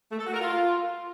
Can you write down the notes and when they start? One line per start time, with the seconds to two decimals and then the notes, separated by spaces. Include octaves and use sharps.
0.12 A3
0.19 A4
0.27 F#4
0.34 A#4
0.41 F4